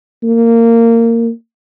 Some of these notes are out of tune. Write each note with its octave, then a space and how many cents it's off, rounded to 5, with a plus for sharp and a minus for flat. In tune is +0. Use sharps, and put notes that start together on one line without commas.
A#3 -20